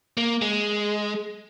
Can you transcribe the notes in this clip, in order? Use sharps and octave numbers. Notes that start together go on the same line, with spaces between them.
A#3
G#3